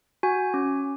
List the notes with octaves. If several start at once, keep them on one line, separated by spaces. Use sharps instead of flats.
F#4 G#5
C#4